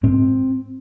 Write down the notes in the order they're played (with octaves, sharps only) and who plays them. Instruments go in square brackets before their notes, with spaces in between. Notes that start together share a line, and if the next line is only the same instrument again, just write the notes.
[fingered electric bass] G#2 C4